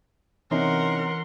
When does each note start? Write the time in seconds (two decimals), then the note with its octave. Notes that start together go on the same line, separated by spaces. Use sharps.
0.51 C3 E3 C#4 D#4 A#4 F#5 C6